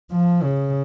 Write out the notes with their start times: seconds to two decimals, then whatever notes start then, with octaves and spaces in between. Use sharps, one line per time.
0.12 F3
0.43 C#3